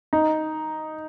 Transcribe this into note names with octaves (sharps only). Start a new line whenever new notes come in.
D#4